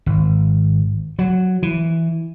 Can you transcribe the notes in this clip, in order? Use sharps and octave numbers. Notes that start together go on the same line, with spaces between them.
G#1
F#3
E3